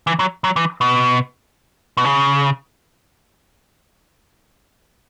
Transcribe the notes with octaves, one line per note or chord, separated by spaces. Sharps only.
E3
F#3
F#3
E3
B2
B2
C#3